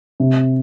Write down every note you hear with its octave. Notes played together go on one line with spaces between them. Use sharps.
C3